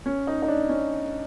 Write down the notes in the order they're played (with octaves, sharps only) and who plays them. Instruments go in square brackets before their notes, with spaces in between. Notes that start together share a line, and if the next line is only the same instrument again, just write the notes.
[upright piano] C#4
D#4
D#4
D4
C#4